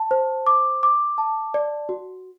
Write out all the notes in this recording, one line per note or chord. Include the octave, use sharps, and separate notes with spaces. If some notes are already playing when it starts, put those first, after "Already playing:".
Already playing: A5
C5
D6
D6
A5
D5
F#4